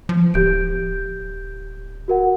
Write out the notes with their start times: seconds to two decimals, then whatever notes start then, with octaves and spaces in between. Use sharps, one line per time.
0.09 F3
0.34 D1 G4 G6 D7
2.08 F#4 A#4 F#5